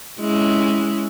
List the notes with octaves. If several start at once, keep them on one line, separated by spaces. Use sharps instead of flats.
G#3 C#4 E4